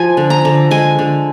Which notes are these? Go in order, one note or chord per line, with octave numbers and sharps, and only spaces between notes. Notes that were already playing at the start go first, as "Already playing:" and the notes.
Already playing: F3 G#5
D3
A#5
D3
G#3 G#5
D3